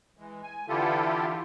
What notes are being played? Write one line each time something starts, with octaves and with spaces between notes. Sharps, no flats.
E3 G#3
G#5
D3 E3 E4 F4 G4 A4